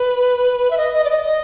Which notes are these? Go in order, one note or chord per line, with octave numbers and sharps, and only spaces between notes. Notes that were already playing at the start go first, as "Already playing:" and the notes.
Already playing: B4
E5
D#5
D#5
D5
D#5
D#5